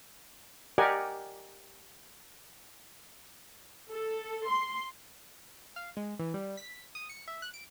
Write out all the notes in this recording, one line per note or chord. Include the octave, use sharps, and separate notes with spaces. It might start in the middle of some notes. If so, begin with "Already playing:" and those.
G4 A#4 D5 D#5 F#5 G#5
A4
C6
F5
G#3
E3
G3
B6
D#6
C#7
E5
F#6
D7